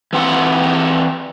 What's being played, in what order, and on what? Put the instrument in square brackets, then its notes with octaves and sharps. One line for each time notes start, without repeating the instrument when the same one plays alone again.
[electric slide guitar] E3 C4 F#5